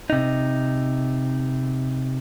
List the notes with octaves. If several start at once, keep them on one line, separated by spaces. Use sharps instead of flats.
C3 D#4